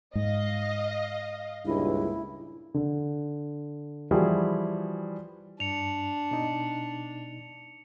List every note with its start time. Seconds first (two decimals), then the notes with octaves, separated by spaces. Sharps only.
0.15 G#2 D#5 F5
1.65 C#2 G2 A#2 E4
2.74 D3
4.11 E3 F3 G3 E4 F#4 G#4
5.60 G2 D4 C#7 F7
6.31 B2 D#4